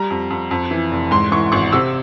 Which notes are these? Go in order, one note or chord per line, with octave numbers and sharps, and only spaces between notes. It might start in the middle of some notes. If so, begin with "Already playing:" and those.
Already playing: G3 A#5
F2
F2
F2
E3
F1
G#2 C6
E3 C#6
G#1 C#6
C3 E6